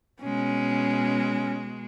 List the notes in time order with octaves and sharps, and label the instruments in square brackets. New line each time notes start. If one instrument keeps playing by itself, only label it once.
[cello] B2 G#3 [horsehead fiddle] C#4